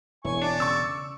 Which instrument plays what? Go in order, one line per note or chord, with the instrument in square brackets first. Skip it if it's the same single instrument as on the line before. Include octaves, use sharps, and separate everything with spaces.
[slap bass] E1 [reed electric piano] E4 C#5 [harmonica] G#5 C#6
[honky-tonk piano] D4 [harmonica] D5
[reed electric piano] C#3 [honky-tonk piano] C#6 E6